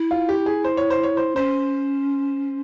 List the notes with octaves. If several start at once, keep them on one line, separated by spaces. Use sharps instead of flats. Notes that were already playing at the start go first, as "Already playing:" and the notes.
Already playing: E4
F4
G4
G#4
C5
C#5
C5
C#5
C5
C#4 C5